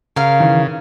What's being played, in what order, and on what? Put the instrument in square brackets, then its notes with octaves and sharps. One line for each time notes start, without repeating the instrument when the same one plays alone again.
[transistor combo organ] C#3 [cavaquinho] A#4 F5
[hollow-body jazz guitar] D#3 E3